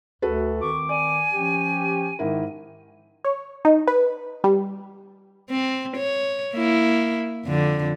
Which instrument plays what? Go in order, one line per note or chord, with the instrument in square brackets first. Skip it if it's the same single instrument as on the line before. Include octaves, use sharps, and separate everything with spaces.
[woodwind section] D2 [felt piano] F#4 A4 B4
[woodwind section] D#3 C4 D6 [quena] C#6
[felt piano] D5 [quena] G#5
[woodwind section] F3 C#4 G4
[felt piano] G#2 E4 A#4 [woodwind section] D#3
[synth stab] C#5
D#4
B4
G3
[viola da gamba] C4
C#5
A#3 E4
F2 D3